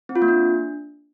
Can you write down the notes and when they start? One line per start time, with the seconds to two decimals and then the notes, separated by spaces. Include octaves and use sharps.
0.09 C4
0.16 F4
0.22 A#3
0.28 D4